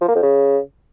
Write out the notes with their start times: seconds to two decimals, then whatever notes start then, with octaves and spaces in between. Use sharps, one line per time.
0.01 F3
0.08 A#3
0.16 F2
0.23 C#3